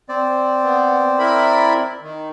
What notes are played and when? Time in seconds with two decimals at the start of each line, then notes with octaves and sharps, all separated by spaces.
0.09 C4 D5
0.63 B3
1.19 E4 A#4 B5
2.01 D#3